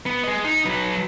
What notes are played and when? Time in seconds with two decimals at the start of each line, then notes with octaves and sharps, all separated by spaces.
0.06 B3
0.23 G#4 D#5
0.44 D#4
0.65 F#3 B4